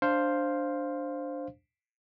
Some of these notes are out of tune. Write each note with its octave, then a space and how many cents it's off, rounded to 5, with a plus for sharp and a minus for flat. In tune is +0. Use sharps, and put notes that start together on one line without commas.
D4 +0 C5 +5 F5 +0